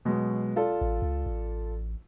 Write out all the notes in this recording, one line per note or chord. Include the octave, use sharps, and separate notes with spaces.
B2 F#3 G#3
F4 A4 D5
A1
C#2
A1